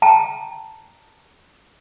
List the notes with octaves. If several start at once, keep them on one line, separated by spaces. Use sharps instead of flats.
G5 A5 A#5